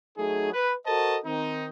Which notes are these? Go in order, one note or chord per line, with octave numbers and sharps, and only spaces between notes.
F#3 A3 D#4 G#4
B4
F#4 A4 A#4 C5 D#5 A5
D#3 C4 D#4